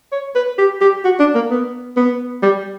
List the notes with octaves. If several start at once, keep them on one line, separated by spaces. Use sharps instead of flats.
C#5
B4
G4
G4
F#4
D4
A#3
B3
B3
G3